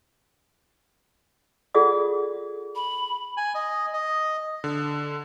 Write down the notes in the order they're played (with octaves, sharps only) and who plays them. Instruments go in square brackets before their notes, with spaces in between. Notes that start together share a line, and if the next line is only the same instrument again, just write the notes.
[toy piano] F4 G#4 A4 D5 F#5 D#6
[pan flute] B5
[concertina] G#5
D#5
D#5
[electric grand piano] D3